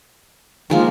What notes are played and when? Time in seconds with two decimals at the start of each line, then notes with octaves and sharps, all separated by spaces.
0.70 D#3 F3 G#3 A#3